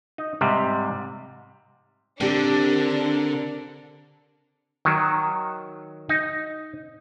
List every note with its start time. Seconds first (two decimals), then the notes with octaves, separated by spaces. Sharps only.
0.18 D#4
0.41 G#2 C3 G3
2.21 D3 C4 D4 G4 A#4
4.85 D#3 F#3
6.09 D#4